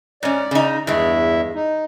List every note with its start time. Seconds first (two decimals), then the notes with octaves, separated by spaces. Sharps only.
0.23 G#2 C#4 D5
0.51 C#3 D#4
0.87 E2 G2 G#3 E4 E5
1.54 D#4